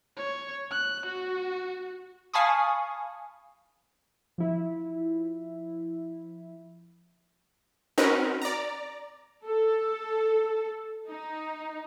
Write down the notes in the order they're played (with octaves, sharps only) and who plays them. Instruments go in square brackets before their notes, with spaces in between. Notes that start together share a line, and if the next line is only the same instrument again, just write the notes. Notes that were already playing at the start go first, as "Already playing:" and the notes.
[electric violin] C#5
F#6
F#4
[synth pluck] F5 G#5 A5 B5 C#6 D#6
[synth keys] F3 E4
[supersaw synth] C4 C#4 D#4 F#4 A#4 B4
D5 A#5
[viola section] A4
D#4